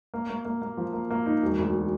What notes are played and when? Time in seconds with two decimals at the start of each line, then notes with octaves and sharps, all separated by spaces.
0.14 A#3
0.30 A#3
0.45 A#3
0.62 A#3
0.77 F3
0.93 A#3
1.10 A#3
1.26 D#4
1.43 E1
1.58 D2